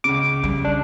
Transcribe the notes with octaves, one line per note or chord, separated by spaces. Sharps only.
C#2 C#3 D6
G3
D4